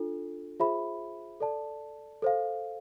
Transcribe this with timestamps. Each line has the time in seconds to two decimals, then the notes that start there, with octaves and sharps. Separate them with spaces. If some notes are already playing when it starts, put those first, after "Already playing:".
Already playing: D4 F4 A4
0.60 F4 G#4 C5 E5 B5
1.40 A4 D5 A5
2.22 A4 C5 F5